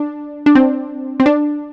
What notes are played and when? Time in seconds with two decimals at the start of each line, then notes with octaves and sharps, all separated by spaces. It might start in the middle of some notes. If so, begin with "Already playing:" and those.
Already playing: D4
0.46 D4
0.55 C4
1.20 C4
1.26 D4